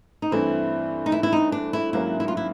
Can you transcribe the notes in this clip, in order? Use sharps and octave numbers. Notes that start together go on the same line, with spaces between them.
D#4
G2 E3 A3 C4 E4
D#4
E4
E4
D#4
D4
E4
G#2 D#3 F#3 A#3 C#4 E4
E4
F4
E4